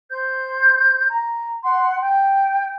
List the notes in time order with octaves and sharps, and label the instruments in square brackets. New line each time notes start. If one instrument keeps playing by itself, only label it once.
[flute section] C5 G6
A#5
F#5 C6
G5